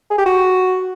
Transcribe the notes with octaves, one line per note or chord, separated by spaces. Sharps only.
G#4
G4
F#4